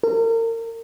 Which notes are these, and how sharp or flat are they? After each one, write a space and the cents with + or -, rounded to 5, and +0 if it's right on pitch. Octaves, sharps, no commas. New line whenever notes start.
A#4 -35